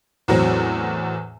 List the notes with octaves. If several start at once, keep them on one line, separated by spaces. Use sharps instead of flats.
E2 A2 F#3 C4